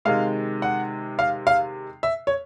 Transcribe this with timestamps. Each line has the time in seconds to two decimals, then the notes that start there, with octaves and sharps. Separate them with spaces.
0.05 C3 D#3 G#3 F5
0.62 F#5
1.19 F5
1.47 F5
2.03 E5
2.27 C#5